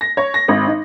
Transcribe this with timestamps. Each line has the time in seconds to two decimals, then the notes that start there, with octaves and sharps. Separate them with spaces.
0.01 A#6
0.17 C#5
0.34 A#6
0.48 G#1
0.67 D#4